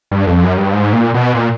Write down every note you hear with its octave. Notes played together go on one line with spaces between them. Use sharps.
G2
F2
F#2
G2
G#2
A#2
B2
A#2